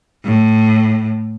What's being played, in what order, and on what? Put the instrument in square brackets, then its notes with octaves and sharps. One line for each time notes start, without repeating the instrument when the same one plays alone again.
[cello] A2